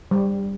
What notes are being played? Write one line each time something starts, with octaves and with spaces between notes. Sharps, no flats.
G3